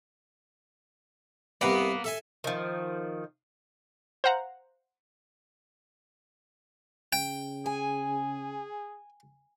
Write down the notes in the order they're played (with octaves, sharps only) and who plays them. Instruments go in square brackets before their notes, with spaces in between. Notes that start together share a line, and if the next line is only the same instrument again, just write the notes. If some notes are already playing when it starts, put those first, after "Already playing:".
[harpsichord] C2 C3 B4 [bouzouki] A#3 B3
[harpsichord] A4 E5 G#5
[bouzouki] D#3 F3
[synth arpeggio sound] C5 F5 F#5 A#5
[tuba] C#3 [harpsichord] G5
[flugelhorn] G#4 [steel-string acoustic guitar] G#5